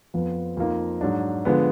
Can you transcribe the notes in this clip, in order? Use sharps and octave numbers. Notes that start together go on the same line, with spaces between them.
F2 F3 B3
F2 F3 A#3 D#4
G#2 F#3 D4
D3 F3 G#3 B3